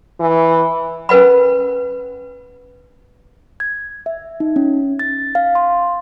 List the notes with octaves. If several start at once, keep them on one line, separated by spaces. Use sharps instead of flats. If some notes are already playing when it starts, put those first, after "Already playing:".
E3
C#4 A#4 B4 F#5 B5
G#6
E5
D#4
C#4
A6
F5
C6